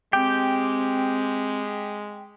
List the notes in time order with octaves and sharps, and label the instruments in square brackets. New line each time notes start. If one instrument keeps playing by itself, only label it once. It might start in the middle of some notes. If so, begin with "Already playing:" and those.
[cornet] G#3 [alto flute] C4 [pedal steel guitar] G4 [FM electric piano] G5